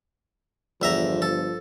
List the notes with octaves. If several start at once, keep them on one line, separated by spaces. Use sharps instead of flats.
G1 E2 F3 E5 A#5
A4